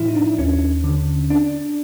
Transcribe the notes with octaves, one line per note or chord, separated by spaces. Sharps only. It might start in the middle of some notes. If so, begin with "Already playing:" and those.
Already playing: A2 F3 E4 F4
D#4
D4
D#2 C#4
D3
D4